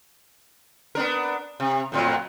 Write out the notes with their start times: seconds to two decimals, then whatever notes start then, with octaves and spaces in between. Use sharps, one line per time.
0.95 B3 D4 A#4
1.60 C3
1.92 F2 A2 F#3